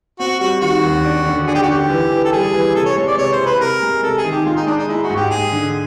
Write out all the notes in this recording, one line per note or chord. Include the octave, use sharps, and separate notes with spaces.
C4 F#4
G3 F#4
D#3 F#4
D#2
D4
D3
D4 G#4
G4
F#4
D3 G4
E3
E3
A4
G3 G#4
E3
C3 A4
C#5
G#3
D5
C3 C#5
C5
C3
B4
C3 A#4
G#3
C3 A4
G#4
D#3
G4
G#3 F4
D#4
G#3 D4
D#4
G#3 E4
F#4
G#2
G4
G#3 G#4
D3